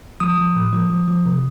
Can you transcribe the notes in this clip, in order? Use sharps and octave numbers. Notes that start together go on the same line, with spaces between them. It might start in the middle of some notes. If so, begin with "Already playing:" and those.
F3 D#6
F3
A2
F3
F3
F3
C3